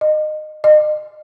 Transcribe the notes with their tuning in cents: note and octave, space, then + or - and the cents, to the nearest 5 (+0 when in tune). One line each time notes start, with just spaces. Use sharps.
D#5 -20
D#5 -35